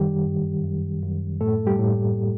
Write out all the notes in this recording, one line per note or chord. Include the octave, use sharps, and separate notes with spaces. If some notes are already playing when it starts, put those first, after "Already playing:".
Already playing: F#2 D#3 G3 G4
G2
F#2
F#2
A2 A3 A4
G3 G4
A2